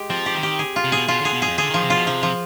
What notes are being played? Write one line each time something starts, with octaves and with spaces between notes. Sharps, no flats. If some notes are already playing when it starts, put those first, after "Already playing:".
Already playing: G#3 G4
F3 C4
G4
D#3
G4
G#4
F4
C3
B2 G#4
B2 F4
D3 G#4
B2
F2 G#4
D3 G#4
D#3 F3
C3
B2 F4
C3 F3
F3